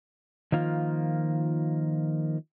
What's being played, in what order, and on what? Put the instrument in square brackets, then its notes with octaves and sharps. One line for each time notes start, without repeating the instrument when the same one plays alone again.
[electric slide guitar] D#3 F3 A#3 F4